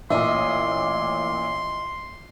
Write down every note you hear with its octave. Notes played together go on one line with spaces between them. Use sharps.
A1 A#2 D#5 E5 C6